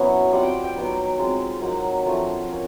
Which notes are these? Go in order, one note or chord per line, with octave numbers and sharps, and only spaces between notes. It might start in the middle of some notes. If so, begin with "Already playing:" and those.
Already playing: F#3 B3 C#4 E4
G3 C4 F4 F#5
G5
G5
F#3 B3 D#4
G#3 C4 F4
F#3 A#3 D#4 F#5
F3 A3 D4 F4
A#3 C#4 F4